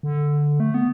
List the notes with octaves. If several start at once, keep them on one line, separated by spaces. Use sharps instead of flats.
D3
A3
B3